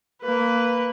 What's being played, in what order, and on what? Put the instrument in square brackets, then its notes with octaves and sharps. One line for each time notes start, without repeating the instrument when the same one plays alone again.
[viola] A#3 B4